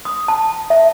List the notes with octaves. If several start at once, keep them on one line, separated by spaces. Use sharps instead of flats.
D#6
A5
E5